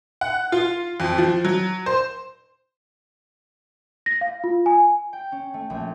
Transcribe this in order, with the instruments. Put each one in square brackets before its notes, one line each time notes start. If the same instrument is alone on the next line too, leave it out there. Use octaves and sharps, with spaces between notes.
[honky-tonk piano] F#5
F4
F2
F3
F#3
C5
[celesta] A#6
F5
F4
G#5
[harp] G5
C#4
A3
A#1